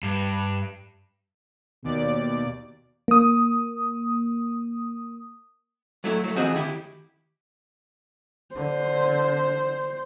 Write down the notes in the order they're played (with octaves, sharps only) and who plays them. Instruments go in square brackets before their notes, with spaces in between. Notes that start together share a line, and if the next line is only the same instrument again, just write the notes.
[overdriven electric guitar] G2
[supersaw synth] D#2 D5 [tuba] B2
[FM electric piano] A#3 D#6
[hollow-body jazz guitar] F#3 A3 E4
F#3 A3
E3 F3 C4 F#4 G#4 D#5
D#3 E4 G4
[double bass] D3 [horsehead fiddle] C5